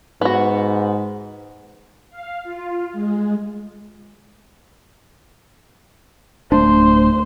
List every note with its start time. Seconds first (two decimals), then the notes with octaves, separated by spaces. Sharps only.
0.21 G#2 B3 F#4
2.10 F5
2.44 F4
2.93 G#3
6.52 D1 A3 D4 C5